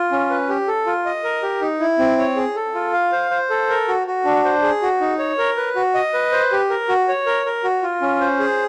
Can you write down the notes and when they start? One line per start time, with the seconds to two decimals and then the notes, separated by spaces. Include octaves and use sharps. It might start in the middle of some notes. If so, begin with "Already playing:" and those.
Already playing: F4
0.12 C#4
0.30 B4
0.49 G4
0.68 A4
0.86 F4
1.05 D#5
1.24 A#4
1.43 G4
1.61 D#4
1.80 E4
1.99 C4
2.19 C#5
2.36 G#4
2.56 A4
2.75 F4
2.93 F5
3.12 C5
3.31 C5
3.50 A4
3.69 A#4
3.88 F#4
4.07 F#4
4.25 D4
4.45 C5
4.62 G#4
4.82 F#4
5.01 D#4
5.19 C#5
5.38 A#4
5.57 B4
5.76 F#4
5.94 D#5
6.14 B4
6.32 C5
6.52 G4
6.70 A#4
6.89 F#4
7.08 C#5
7.26 A#4
7.46 A#4
7.64 F#4
7.83 F4
8.01 C#4
8.21 C5
8.39 G#4